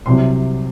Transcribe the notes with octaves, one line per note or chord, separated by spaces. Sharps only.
C2 C3 F#3 C6